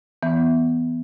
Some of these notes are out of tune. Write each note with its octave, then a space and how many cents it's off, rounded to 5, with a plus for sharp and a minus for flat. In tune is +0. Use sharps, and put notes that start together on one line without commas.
E3 +5 B3 +0